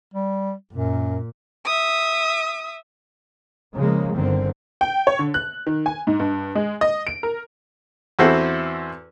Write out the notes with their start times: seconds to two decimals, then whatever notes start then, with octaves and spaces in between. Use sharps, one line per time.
0.14 G3
0.73 F#2 A#2
1.66 E5 D#6
3.76 C#3 F3 G#3 A#3
4.14 G1 D3 D#3 C4
4.81 G5
5.07 C#5
5.19 D3
5.34 F#6
5.67 D#3
5.86 G#5
6.07 G#2
6.19 G2
6.55 G#3
6.81 D#5
7.07 D7
7.23 A#4
8.19 E2 C4 E4 F#4 A4 C5